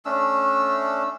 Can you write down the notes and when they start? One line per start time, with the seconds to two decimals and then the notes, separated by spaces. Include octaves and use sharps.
0.05 A3 C#4 D4 E6